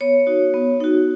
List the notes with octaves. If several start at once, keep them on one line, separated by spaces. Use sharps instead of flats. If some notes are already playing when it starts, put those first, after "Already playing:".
B3 C#5
D#4 F#4
B3
D#4 F#4